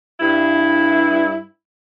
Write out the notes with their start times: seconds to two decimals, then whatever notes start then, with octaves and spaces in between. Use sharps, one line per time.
0.20 G2 E4